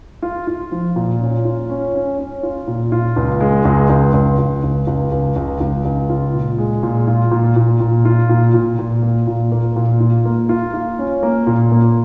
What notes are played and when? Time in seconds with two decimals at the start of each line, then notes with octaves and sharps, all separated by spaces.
0.22 F4
0.47 F4
0.72 F3
0.96 A#2
1.21 C#4
1.45 F4
1.69 C#4
1.94 C#4
2.18 C#4
2.43 F4
2.68 A#2
2.92 F4
3.16 C#2
3.40 G#3
3.65 C#2
3.90 C#2
4.13 C#2
4.39 C#2
4.63 C#2
4.87 C#2
5.12 C#2
5.36 C#2
5.60 C#2
5.85 C#2
6.10 F4
6.34 A#2
6.58 G#3
6.83 A#2
7.07 F4
7.31 A#2
7.56 A#2
7.81 A#2
8.05 F4
8.29 A#2
8.54 A#2
8.79 A#2
9.03 A#3
9.27 A#2
9.52 A#3
9.76 A#2
10.00 F4
10.25 A#3
10.49 F4
10.74 F4
10.99 C#4
11.23 A#3
11.47 A#2
11.72 A#3